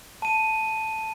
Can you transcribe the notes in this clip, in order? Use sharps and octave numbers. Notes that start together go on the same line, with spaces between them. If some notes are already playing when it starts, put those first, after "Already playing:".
A5 D#7